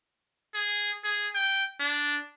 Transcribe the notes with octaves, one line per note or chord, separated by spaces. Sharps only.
G#4
G#4
G5
D4